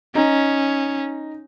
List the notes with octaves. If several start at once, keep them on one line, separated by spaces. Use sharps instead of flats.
C#4 D#4